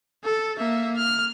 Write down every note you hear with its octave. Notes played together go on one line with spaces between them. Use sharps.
A4
A#3 E5
F6